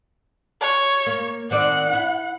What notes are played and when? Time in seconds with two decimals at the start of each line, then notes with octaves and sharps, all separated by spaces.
0.61 C#5
1.06 A#3
1.51 D#3 C4 D5 F#5
1.93 E4